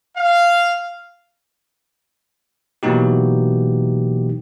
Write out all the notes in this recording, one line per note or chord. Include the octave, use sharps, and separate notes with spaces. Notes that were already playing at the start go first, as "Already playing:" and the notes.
F5
B2 E3 F#3 A#3 D#4 G4